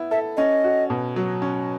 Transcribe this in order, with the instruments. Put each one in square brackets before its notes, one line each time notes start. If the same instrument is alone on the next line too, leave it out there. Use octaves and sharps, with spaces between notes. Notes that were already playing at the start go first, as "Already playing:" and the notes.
Already playing: [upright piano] B3 E4
[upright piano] A4 [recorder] E5
[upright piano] C#4 [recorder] D#5
[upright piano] F#4
B2
F#3
C#4